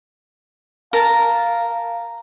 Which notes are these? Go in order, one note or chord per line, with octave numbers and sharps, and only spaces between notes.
A#4 F5 A5